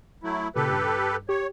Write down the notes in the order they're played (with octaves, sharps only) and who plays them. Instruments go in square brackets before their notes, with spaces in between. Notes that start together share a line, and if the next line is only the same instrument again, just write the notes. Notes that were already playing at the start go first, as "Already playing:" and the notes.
[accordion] F#3 A3 E4
[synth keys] A#2 C#3 [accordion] G4 A4 B4
[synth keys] G2
[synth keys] G4 [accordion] C#5